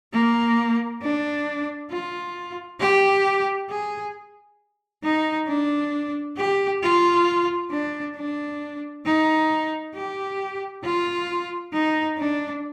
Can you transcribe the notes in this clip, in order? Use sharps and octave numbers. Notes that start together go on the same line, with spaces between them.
A#3
D4
F4
G4
G#4
D#4
D4
G4
F4
D4
D4
D#4
G4
F4
D#4
D4